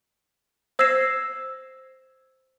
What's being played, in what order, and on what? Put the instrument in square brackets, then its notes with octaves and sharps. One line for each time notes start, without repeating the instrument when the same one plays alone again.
[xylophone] C5 E6 G#6 A#6 C7 E7